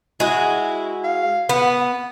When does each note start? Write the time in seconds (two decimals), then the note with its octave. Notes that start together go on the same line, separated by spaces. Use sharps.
0.20 G#3 E4 F#4
1.04 F5
1.49 B3 F#5